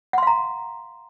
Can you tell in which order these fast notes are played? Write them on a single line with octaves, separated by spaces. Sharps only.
F#5 C6 F5 A#5